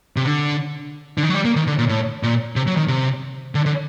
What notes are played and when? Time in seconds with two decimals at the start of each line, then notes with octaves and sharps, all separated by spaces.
0.16 C3
0.25 D3
1.18 D3
1.23 D#3
1.29 F#3
1.35 G3
1.45 A#3
1.56 D#3
1.67 D3
1.78 A#2
1.89 A2
2.23 A#2
2.56 C3
2.67 F#3
2.77 D#3
2.88 C3
3.55 D3
3.66 D3